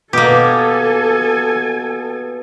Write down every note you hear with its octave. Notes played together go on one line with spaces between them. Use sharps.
B2 A#3 G4 A4 G#5